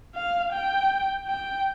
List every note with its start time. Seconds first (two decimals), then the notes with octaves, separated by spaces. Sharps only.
0.15 F5
0.53 G5
1.28 G5